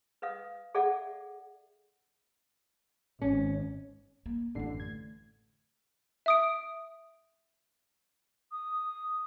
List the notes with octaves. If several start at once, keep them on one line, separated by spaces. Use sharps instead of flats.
B4 D#5 F5 D#6
G#4 A4 D5 E5 F#5
G#1 C#4
A#3
A1 F#2 D3 A3 C7
G#6
E5 D#6 D7
D#6